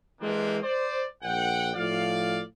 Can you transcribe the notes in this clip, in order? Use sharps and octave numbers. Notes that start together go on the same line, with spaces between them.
E3 G#3 A#3 C4 D4 G4
C5 D5
A#1 F#5 G5
A2 F3 D5 F5